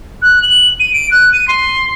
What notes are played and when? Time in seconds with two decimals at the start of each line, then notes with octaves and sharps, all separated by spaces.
0.22 F#6
0.42 F#7
0.80 D#7
0.93 D7
1.11 F#6
1.32 D#7
1.48 C6